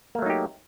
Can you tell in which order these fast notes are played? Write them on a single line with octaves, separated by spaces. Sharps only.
A#3 A3 F#3 D#4 G4